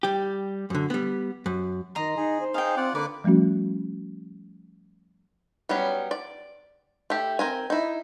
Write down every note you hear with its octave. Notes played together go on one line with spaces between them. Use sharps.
G3 G4
F#2 D3
G3 B3
F#2
D#3 D#5 A#5 C6
D#4 G#4
C5
D#4 G#4 F5 G5
C4 F4 D5 F#5
D3 A#3 B4 D5 D6
F3 G3 A3 C#4 F#4
F#3 G3 B3 C#4
D5
A3 G4
C4 A#4 G#5
D#4 E4